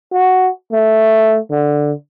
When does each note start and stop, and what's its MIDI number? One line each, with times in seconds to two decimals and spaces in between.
0.13 0.49 66
0.72 1.38 57
1.51 1.92 50